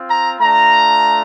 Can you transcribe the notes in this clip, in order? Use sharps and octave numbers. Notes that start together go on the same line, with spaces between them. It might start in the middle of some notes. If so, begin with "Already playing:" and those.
Already playing: C4 F4
A#5
A3 D4 F4 A#5